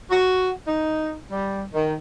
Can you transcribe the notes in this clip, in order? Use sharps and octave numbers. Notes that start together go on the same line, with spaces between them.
F#4
D#4
G3
D#3